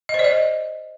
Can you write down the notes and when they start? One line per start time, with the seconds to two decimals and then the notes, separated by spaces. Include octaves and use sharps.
0.09 D#5
0.14 C5
0.19 D5
0.24 D#5